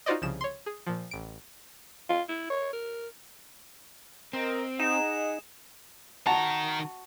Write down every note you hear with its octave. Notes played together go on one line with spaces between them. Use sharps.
D#4 F4 F#4 C5 D5 D#5
C2 C#3 F3 E7
C#5 C6
G#4
A#2 F3
A1 D7
F4
E4
C#5
A#4
C4 A#4 D#5
D#4 G#4 D#5 F#5 E7
D#3 F#4 A5 A#5